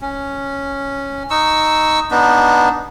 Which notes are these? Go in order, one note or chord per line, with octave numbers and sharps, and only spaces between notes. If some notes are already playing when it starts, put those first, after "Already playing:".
C#4
D#4 C#6 E6
B3 D4 D#4